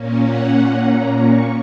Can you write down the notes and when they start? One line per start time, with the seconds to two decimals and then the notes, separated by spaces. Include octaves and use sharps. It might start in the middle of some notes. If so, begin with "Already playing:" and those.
Already playing: A#2 A#3 C#4
0.24 F#5
0.55 F#5
0.87 A#5
1.17 C#6